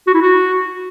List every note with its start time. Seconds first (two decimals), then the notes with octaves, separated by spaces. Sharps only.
0.07 F#4
0.14 E4
0.22 F#4